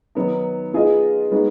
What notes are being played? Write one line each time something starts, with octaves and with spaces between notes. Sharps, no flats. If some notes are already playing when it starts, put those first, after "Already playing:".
D#3 F#3 B3 D#4
B3 F4 G#4 D#5
G#3 B3 D#4 F#4